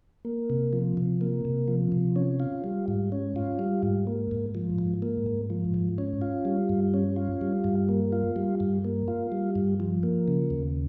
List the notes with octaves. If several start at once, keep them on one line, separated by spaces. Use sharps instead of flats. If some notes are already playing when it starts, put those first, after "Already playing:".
A#3
C3
F3
C3
A#3
C3
F3
C3
C#4
F4
G3
G#2
C#4
F4
G3
G#2
A#3
G#2
F3
G#2
A#3
G#2
F3
G#2
C#4
F4
G3
G2
C#4
F4
G3
G2
A#3
F4
G3
G2
A#3
F4
G3
G2
F3
A#3
C#3
D#2